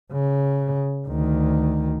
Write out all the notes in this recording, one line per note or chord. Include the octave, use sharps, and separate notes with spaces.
C#3
D2 D#3